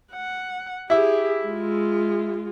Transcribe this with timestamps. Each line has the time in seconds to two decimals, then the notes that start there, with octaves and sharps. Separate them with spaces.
0.13 F#5
0.90 E4 G4 G#4 E5
1.45 G#3 F4